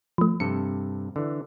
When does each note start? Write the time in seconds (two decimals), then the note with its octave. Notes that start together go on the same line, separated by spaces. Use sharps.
0.18 F3 A3
0.40 G2 C3 A4 C#7
1.16 D3 E3